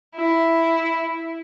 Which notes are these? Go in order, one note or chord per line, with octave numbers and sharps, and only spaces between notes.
E4